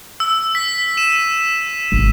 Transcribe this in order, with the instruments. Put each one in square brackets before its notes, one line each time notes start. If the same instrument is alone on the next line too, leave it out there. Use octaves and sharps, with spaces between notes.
[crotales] E6
B6
D#7 E7
[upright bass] G#1